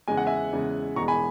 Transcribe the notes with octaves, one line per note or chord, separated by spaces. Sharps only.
E2 C#3 G#3 G#5
F#5
E5 G#5
E2 C#3 G#3
E1 E2 B2 G#3 A#5 C#6
G#5 B5